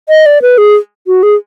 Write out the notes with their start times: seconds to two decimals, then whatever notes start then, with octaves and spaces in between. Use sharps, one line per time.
0.09 D#5
0.26 D5
0.42 B4
0.58 G#4
1.07 F#4
1.23 G#4